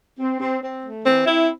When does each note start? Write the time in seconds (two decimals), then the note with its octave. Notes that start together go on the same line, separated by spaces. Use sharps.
0.20 C4
0.40 C4
0.62 C4
0.83 A3
1.04 E3 C4
1.26 C4 E4